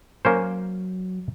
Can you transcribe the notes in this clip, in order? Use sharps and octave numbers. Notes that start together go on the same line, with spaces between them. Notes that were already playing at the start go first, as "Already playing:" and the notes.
F#3 A#3 C#4 C5